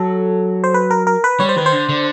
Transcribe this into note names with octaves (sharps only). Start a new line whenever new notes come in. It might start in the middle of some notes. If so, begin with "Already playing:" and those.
Already playing: F#3 A4
C5
B4
A#4
A#4
B4
G3 C#5
C5
D#3 B4
C5
D3
D3